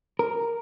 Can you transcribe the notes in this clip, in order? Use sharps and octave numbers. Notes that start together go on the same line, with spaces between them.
A#4